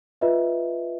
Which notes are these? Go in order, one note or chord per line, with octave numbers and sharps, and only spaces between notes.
F4 B4 D#5 E5